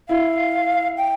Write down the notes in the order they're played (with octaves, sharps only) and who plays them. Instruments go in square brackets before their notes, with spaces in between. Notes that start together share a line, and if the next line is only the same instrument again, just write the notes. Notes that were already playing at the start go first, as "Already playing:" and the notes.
[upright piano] E4 [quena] F5
[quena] G5